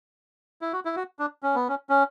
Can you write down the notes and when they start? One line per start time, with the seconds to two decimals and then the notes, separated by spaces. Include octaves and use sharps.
0.61 E4
0.73 F#4
0.85 E4
0.96 F#4
1.19 D4
1.43 C#4
1.55 B3
1.69 C#4
1.89 C#4